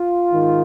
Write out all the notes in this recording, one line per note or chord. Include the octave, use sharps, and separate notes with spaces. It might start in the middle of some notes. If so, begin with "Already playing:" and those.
Already playing: F4
G#2 D#3